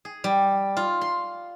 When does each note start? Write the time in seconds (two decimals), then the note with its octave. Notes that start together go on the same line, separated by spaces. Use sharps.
0.05 G#4
0.24 G3
0.77 F4
1.01 C6